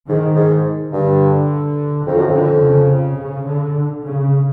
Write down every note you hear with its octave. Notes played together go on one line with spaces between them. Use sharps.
G#2 D#3
G#2
G2 D3
F2 D#3
F#2
F2
D3
C#3
C#3
D3
C#3